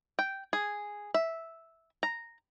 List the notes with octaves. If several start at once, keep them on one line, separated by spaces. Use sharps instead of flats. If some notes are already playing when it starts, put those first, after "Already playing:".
G5
G#4
E5
A#5